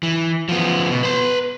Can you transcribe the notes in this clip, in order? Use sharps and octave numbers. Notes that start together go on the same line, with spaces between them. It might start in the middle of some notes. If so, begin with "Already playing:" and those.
E3
F3 B3
B2
B4 C6